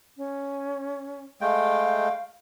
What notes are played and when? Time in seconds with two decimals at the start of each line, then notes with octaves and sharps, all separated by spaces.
0.17 C#4
1.41 G#3 A3 F5 G5